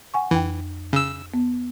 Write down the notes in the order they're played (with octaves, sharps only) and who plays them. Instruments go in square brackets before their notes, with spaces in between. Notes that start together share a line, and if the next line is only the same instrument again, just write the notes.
[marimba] F#5 G#5 C#6
[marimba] F2 G5 [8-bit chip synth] E3
[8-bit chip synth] C#3 E6
[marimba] B3